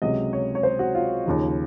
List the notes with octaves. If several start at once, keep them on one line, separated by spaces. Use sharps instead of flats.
C#2 C3 F#3 D#5
C#5
C#5
C5
F#4
F4
D#2 C#3 F3